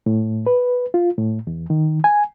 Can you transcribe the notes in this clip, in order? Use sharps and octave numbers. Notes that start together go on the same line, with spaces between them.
A2
B4
F4
A2
E2
D#3
G#5